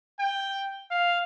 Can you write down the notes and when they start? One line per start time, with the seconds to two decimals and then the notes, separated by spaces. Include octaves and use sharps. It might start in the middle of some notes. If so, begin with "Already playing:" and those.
0.20 G5
0.91 F5